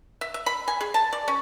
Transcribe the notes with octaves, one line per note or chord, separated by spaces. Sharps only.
E5
E5
B5
G#5
G#4
A5
D5
C#4